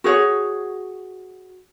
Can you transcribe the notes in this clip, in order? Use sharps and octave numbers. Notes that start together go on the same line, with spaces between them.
F#4 G#4 C#5